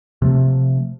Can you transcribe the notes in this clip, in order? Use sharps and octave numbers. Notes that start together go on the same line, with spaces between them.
C3 F3 A3